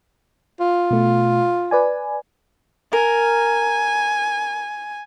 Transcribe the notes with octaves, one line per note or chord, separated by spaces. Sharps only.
F4
B2 A3
B4 D5 G#5
A#4 G#5